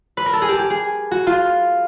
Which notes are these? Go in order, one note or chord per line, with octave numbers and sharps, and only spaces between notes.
B4
A#4
A4
G#4
G4
G4
G#4
F#4
F4